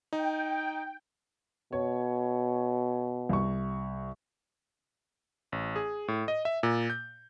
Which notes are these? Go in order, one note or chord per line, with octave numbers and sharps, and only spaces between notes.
D#4 G5
B2 C#5
C2 C#6
A1
G#4
A2
D#5
E5
A#2
G6